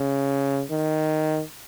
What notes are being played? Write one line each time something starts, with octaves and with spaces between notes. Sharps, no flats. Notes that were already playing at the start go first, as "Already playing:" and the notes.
Already playing: C#3
D#3